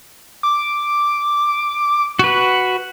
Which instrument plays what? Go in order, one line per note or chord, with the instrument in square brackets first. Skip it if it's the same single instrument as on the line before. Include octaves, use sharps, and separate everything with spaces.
[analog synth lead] D6
[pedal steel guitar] F#4 B4